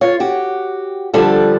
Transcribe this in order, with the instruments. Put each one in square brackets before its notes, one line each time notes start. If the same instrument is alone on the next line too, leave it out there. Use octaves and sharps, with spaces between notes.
[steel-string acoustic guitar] F4 C#5
F#4 G4
D3 F3 G3 D4 A4